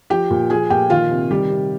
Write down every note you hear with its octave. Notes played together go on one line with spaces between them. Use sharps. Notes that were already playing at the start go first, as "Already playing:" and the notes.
F3 G4 G5
A#2
F3 G#4 G#5
A#2 G4 G5
D#3 F4 F5
C3
D#3 G3 G4
C3